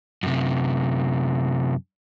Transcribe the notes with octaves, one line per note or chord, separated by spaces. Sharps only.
F#2 C3